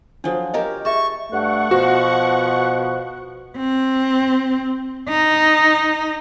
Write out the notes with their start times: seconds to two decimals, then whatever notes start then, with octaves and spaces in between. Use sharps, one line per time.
0.24 F3 F#3 D4 A4
0.54 G4 A#4 C#5 D#5 A#5
0.85 G#4 E5 A5 C#6
1.32 G2 A3 F#5 C#6
1.71 B2 F3 F#4
3.57 C4
5.09 D#4